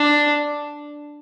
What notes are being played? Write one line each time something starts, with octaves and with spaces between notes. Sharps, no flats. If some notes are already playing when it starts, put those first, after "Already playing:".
Already playing: D4